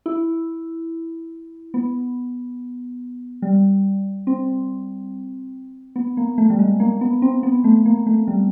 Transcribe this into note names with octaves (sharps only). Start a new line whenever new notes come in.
E4
B3
G3
C4
B3
A#3
A3
G3
G#3
A#3
B3
C4
B3
A3
A#3
A3
G3